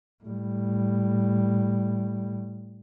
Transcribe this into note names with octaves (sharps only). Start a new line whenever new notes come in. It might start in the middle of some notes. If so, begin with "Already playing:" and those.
A2 G3